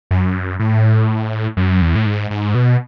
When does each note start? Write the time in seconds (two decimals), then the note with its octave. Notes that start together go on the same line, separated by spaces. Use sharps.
0.11 F#2
0.60 A2
1.57 F#2
1.82 E2
1.95 A2
2.06 G#2
2.31 G#2
2.55 B2